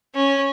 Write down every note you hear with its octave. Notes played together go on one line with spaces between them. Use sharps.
C#4